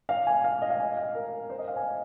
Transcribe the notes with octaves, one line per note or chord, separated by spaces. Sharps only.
F5
G#5
F5
D#5
F5
G#5
F5
A#4
C5
D#5
F5
G#5